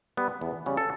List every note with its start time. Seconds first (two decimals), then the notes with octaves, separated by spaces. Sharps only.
0.17 G3 B3
0.41 E2
0.66 C#3 G3 C#4
0.77 A4